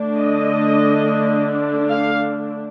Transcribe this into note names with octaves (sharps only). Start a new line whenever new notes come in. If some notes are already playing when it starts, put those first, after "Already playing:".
Already playing: D3 A3 D4
D#5
F5